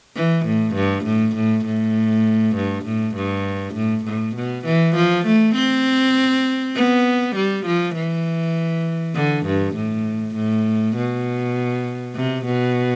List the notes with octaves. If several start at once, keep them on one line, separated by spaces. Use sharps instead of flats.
E3
A2
G2
A2
A2
A2
G2
A2
G2
A2
A2
B2
E3
F3
A3
C4
B3
G3
F3
E3
D3
G2
A2
A2
B2
C3
B2